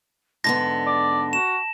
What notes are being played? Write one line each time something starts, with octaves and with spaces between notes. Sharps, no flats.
G#2 D3 B3 A5 A#6
D5
F#4 E7